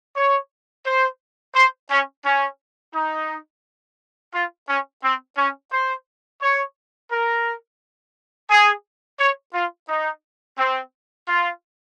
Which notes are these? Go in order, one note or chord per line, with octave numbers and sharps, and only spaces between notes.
C#5
C5
C5
C#4
C#4
D#4
F4
C#4
C4
C#4
C5
C#5
A#4
G#4
C#5
F4
D#4
C4
F4